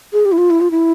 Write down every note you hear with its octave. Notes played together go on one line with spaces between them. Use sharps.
G#4
G4
E4
F4
E4
F4
E4